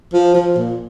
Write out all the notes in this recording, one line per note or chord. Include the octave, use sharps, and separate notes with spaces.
F3
F3
A#2